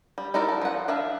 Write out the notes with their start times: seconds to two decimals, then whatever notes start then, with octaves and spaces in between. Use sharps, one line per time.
0.18 G3
0.34 D#4 E4 F#4 A#4 D5
0.48 A4
0.61 F3 F#5
0.88 D4 E5 F5